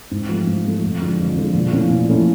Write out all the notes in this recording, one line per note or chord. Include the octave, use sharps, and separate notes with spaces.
G#2
F3 A3
G#2
F3 A3
F2
D3 F3 G#3
F2
D3 F3 G#3
A#2
F3 A3 C#4 E4
A#2
F3 A3 C#4 E4